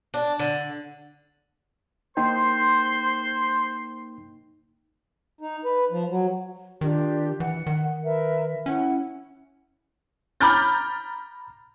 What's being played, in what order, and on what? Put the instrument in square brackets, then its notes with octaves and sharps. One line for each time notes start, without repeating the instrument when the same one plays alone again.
[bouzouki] D4
D3
[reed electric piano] A#3 D#4 G5 [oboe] C5 [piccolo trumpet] C6
[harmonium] D#4
B4
F3
F#3
[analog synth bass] D#3 [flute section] D4 F4 G4
[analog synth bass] E3 [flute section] F#5
[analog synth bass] D#3
[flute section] A#4 B4 E5
[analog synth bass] C#4 [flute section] E4 F#5
[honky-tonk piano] A#5 B5 D6 F6 G6 A6